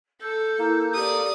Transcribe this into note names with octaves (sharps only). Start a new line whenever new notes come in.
A4 E6 G6
A#3 E4
G4 A4 D5 D#6